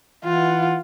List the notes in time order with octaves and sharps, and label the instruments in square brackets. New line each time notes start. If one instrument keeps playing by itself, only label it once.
[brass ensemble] E3 F#5 [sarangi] F4